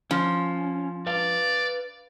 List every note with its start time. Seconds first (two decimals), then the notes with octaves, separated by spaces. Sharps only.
0.11 F3 C#4
1.07 B4 D5 F5